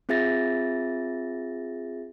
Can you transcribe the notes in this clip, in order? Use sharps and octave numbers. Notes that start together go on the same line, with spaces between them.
C4 F4 G#4 E5 A6 A#6